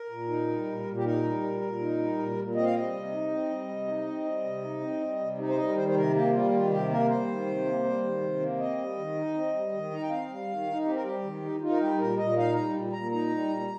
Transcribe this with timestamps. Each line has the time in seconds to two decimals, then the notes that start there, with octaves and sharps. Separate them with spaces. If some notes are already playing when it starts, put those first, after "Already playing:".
Already playing: A#4
0.09 A#2
0.29 D#4
0.47 G3
0.66 A#2
0.85 A#2
0.97 G4
1.04 D#4 A#4
1.23 G3
1.43 A#2
1.61 A#2
1.80 D#4
1.98 G3
2.18 A#2
2.37 A#2
2.55 C4 D#5
2.65 F5
2.74 G3 D#5
2.93 C3
3.12 D#4
3.31 C4
3.50 G3
3.68 C3
3.87 D#4
4.07 C4
4.25 G3
4.44 C3
4.63 D#4
4.81 C4
5.00 G3
5.20 C3
5.38 D#4
5.48 C5
5.57 G3 D#5
5.69 A#4
5.75 D#3 C5
5.88 C5
5.94 C3 A#4
6.13 A#3 G4
6.32 G3 F4
6.51 D#3 F4
6.70 C3 G4
6.89 A#3 A#4
7.08 G3 C5
7.27 D#3
7.46 C3
7.65 A#3
7.84 G3
8.03 D#3
8.21 C3
8.40 A#3
8.58 C4 D#5
8.78 G3
8.97 D#3
9.15 D#4
9.34 C4
9.54 G3
9.72 D#3
9.91 D#4 A#5
10.02 G5
10.09 C4 F5
10.28 G3
10.48 D#3
10.67 D#4
10.85 C4 G4
10.94 A#4
11.04 G3 G4
11.23 D#3
11.42 D#4
11.60 D#4 F4
11.70 A#4
11.80 G3 G4
11.98 A#2 A#4
12.17 A#2 D#5
12.36 D#4 F5
12.54 G3 A#5
12.74 A#2
12.92 A#2 A#5
13.11 D#4 A#5
13.30 G3
13.49 A#2